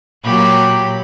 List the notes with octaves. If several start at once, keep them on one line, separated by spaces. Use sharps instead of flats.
A#2 F#3 G4 B5